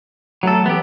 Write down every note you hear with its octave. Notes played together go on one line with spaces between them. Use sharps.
F#3 A3 A4
E3 B3 G4